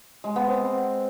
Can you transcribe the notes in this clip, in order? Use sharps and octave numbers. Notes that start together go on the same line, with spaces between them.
G#3
B3
C4